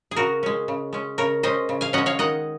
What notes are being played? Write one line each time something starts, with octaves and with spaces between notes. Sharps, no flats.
G#4
C#3 F#4 A#4
G#3 C#4
C#3
G#3 C#4
C#3 A#4 C#5
G#3 C#4 C5 D#5
C#3
F5 G#5
G#3 C#4 D#5 F#5
C#5 F5
D#3 D#5 F#5